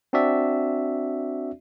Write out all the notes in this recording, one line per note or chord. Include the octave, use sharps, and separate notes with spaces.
C4 D4 F#4 D5 E5